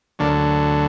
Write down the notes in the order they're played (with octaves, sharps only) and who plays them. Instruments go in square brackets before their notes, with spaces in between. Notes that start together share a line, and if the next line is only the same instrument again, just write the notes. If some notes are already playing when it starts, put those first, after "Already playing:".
[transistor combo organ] D2 D3 F#3 A#3 D4